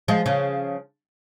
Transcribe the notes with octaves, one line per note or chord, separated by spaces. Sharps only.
F3 G#3
C#3 F3